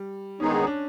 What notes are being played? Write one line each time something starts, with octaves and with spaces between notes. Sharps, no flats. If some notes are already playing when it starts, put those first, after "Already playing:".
Already playing: G3
D#3 G#3 B3 C#4 D#4 G#4
D4
C#4
D4